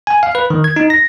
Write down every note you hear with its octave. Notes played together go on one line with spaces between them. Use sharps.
G#5
F5
B4
D#3
G#6
D#4
A#6